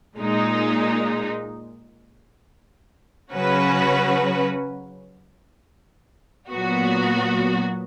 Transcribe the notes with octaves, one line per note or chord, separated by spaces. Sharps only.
A#2 G#3 D#4
C#3 F#3 C#4 F#4 B4
A#2 F#3 B3 F#4